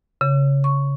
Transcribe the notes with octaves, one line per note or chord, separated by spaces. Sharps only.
C#3
C#6